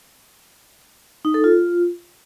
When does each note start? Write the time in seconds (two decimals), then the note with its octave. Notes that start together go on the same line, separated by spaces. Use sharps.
1.25 D#4
1.34 A4
1.44 F4